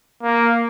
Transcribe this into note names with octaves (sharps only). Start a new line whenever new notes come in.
A#3